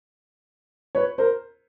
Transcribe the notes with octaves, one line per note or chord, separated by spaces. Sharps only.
B4 C#5
A#4 C5